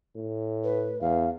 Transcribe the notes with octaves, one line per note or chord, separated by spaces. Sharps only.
A2
B4
E2 F5